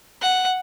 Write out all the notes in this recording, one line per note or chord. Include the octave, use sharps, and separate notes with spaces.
F#5